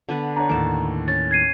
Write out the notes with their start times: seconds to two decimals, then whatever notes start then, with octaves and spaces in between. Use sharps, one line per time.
0.09 D3 B3 B4
0.36 D4 C#5 A#5
0.49 D#2 A2 A5 D6
1.08 C#4 A6
1.31 G#6 C7 D#7